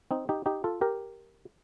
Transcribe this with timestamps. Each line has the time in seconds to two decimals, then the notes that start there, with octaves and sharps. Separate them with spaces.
0.11 C4 D#4
0.29 D#4 G4
0.46 D#4 G4
0.64 F4 A4
0.81 G4 A#4